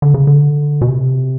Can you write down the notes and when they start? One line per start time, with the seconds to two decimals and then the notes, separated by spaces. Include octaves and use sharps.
0.02 D3
0.14 C#3
0.27 D3
0.81 B2
0.88 C3